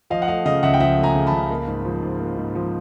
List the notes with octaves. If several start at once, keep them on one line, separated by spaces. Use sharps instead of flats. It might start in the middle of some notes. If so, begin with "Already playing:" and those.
F3 D#5 F5
F#5
A3 D#5 F5
C#3 D#5 F5
C#2 E5 F#5
G5
F3 E5 F#5
A3
G#5 A#5
C#3
A5 B5
C#2
A#3
G#2
F3
G#2
A#3
G#2
F3